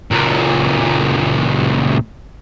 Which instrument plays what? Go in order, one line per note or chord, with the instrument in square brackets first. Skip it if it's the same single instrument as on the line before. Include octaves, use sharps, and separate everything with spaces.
[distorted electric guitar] C#2 A#2